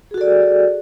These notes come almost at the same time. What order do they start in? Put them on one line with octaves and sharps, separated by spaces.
G#4 F#4 A4 D5